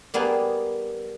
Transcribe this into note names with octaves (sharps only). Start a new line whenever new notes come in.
G3 A#3 B3 G#4